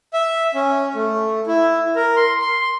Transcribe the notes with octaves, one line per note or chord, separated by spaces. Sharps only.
E5
C#4
A3
E4
A#4
C6
C6